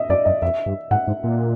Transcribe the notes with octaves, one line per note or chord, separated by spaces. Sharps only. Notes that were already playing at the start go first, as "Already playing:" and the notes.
Already playing: D#5 E5
F#2 D5
F#2 D#5
F2 E5
G2
G#2 F#5
G#2
A#2